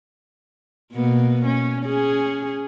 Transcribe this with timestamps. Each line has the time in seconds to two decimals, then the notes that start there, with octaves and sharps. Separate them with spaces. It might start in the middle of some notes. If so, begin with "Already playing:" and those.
0.93 B2 A#3 B3
1.46 C#4
1.85 C#4 G#4